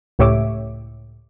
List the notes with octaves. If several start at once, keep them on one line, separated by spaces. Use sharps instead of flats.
C#2 A2 G4 C#5 E5 D6